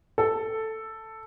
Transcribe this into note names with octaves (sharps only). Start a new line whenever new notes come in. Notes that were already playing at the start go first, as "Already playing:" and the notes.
A4